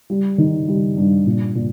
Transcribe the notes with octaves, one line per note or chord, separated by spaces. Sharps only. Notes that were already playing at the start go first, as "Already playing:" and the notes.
G3
D#3
G3
G2
A#2
A#2